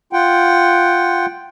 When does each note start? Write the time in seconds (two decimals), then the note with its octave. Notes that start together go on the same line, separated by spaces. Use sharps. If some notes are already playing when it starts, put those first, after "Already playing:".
0.13 F4 F#5 G5